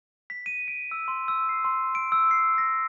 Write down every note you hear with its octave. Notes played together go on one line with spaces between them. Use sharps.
B6
D#7
D7
E6
C6
E6
C7
C6
D7
E6
C7
A#6